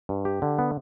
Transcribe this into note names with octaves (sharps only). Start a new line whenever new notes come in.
G2
G4
D3
B3